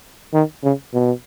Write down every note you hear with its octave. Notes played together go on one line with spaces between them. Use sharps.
D#3
C#3
B2